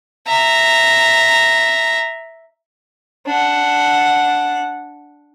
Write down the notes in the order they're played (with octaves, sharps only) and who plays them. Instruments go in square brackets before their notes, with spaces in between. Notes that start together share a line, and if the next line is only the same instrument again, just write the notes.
[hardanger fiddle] E5 A#5
D4 F#5